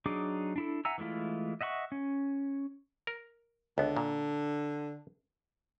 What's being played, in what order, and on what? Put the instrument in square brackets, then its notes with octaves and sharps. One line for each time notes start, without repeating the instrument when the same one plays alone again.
[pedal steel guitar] F#3 D4 D#4 G#4 D6
D4 E4 A4
E5 F#5 G#5 A#5 E6
E3 G#3 A3 E4 F4
D#5 E5 F#5 C6 C#6
C#4
[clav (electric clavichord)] A#4
[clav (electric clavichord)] C#2 B3 [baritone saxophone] D3
[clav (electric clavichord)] A#2